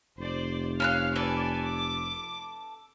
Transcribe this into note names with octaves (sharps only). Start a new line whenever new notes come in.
F1 C5 D5
C#4 F5 B5 F6 F#6
A4 B4 D5 G#5
D6